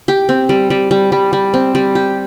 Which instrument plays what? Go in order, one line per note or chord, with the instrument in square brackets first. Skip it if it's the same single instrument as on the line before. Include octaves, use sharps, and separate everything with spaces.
[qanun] G4
C4
G3
G3
G3
G3
G3
C4
G3
G4